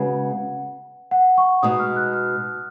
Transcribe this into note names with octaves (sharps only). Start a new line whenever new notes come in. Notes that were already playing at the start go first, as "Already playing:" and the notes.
Already playing: C#3 G#3 B3 F#4 F#5
F#5
C#6
B2 G#3 D#4 D#6
F6
F#6
F6